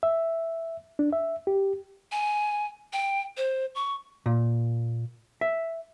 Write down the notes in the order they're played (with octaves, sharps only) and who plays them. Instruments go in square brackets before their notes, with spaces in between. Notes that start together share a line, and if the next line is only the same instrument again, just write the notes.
[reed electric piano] E5
D4
E5
G4
[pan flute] G#5
G5
C5
C#6
[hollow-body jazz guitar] A#2
E5